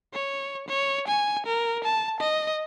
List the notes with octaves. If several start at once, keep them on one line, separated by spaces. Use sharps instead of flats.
C#5
C#5
G#5
A#4
A5
D#5